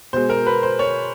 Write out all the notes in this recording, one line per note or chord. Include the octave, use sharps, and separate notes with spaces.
B2 G#3 C5
A#4
B4
C5
C#5